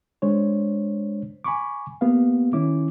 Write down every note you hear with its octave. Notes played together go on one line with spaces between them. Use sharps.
G#3 D4 C5 C#5
G#5 B5 C#6 D6
A#3 B3 G4 F5
D#3 C#4 E4 D6